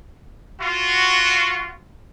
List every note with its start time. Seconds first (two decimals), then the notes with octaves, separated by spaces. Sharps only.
0.60 F4 F#4